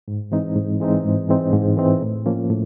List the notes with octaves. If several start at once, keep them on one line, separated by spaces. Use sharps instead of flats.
G#2
E3 G#3 C4 D#4
G#2
E3 G#3 C4 D#4
G#2
E3 G#3 C4 D#4
G#2
E3 G#3 C4 D#4
A2
F3 A#3 C#4
A2